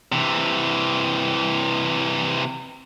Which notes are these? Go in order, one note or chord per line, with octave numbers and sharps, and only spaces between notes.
C3 E3